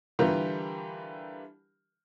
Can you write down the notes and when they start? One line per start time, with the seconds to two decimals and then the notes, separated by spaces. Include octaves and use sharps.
0.19 D3 E3 G3 F4 G4 A#4